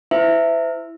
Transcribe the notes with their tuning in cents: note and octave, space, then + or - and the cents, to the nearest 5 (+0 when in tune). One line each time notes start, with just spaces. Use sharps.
E4 +0 C5 -35 E5 +5